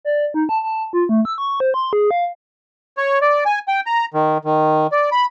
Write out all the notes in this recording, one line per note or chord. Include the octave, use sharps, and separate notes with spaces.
D5
D#4
A5
A5
F4
A3
E6
C#6
C5
C6
G#4
F5
C#5
D5
G#5
G5
A#5
D#3
D#3
D5
B5